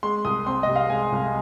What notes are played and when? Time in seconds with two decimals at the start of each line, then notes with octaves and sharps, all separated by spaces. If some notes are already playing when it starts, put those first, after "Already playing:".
0.03 G#3 C6
0.25 C2 D#6
0.46 C4 C6
0.63 C3 D#5
0.76 F5
0.90 G#3 G#5
1.12 C2